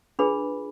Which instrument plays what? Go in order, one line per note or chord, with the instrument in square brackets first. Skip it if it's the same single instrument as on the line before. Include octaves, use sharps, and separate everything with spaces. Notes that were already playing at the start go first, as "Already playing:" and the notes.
[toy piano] D4 F4 G#4 B4 B5